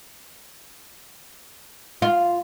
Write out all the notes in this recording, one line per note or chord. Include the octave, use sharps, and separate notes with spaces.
F4